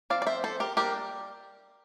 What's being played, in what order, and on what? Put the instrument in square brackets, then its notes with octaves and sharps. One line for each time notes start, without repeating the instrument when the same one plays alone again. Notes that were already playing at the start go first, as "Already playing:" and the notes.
[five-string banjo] F3 C4 D5 F5
D5
C5 E5
A4 C5
G4 A#4
G3 A#3 D4 G4 A#4